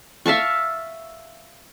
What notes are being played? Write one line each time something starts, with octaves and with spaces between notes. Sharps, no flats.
E5 F5 A5 C#6